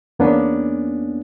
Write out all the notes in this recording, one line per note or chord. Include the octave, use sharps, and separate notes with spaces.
E2 A#3 B3 C#4 D4